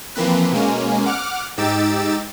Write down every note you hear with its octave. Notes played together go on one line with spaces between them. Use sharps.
E3 F3 A#3 C4 B4
B2 G#3 A#3 C#4
F#5 D6 F6
G#2 D#4 G4 E6 A6 D7